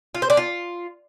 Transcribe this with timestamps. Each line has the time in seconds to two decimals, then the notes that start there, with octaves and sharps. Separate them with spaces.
0.15 F4
0.22 C5
0.30 D4
0.37 F4